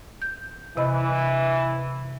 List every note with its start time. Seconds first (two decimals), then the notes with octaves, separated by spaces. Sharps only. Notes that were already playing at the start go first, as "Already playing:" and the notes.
0.22 G6
0.77 C3 E3 D#5 B5